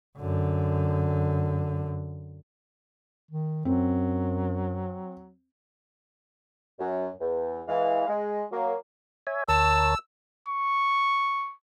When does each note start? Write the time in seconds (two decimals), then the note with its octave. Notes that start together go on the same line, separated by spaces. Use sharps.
0.19 F#2 D3
3.31 D#3
3.65 F#2 F#3 C4
6.80 F#2
7.21 E2
7.68 E3 G#3 F5
8.07 G#3
8.51 F#3 A#3
9.27 C#5 E5 G#5
9.48 D2 A#4 C#5 A5 E6
10.49 C#6